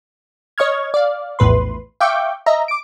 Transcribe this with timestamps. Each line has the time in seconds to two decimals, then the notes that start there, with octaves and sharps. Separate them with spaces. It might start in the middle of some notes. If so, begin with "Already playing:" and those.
0.58 C#5 D#5 C#6 F6 G#6
0.94 D5 F5
1.39 A#1 E2 A2 B4 C6
2.00 E5 F5 G5 C#6 D6 G6
2.46 D#5 E5 A#5
2.68 D6 D7